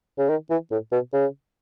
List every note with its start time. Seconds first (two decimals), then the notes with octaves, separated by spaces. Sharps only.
0.18 C#3
0.29 D#3
0.50 E3
0.71 A2
0.92 B2
1.13 C#3